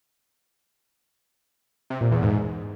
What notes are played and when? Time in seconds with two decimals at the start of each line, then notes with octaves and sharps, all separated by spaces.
1.90 C3
2.01 A#2
2.12 E2
2.22 G#2